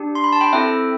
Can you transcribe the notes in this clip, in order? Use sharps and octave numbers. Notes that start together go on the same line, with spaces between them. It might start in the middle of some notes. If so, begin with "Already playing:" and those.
Already playing: D4 G4
C6
B5
A5
G5 B5
C4 E4 A4 E5 G5